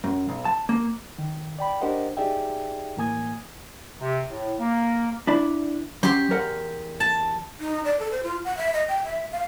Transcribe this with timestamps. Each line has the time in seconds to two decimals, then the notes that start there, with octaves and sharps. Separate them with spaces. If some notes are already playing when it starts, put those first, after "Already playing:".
0.04 F#2
0.29 B1
0.45 A5
0.69 A#3
1.19 D#3
1.59 D5 G5 B5
1.81 D4 G4 A#4 C5 D#5 F#5
2.17 D#4 G4 G#4 D5 E5 G5
2.97 A2 E3 A#3 G#5 D#6 G#6
4.01 C3
4.29 A2
4.59 A#3
5.27 D4 E4 D5
6.03 F#3 C#4 G4 C6
6.30 E2 A#4 F#5
7.00 A5
7.60 D#4
7.85 D5
7.99 A4
8.12 C5
8.23 F4
8.45 F#5
8.57 E5
8.74 D#5
8.88 G5
9.04 E5
9.32 F5